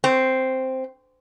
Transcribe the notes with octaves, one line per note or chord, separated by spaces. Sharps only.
C4